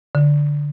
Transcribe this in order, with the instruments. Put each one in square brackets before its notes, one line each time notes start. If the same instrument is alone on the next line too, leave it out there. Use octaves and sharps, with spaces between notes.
[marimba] D3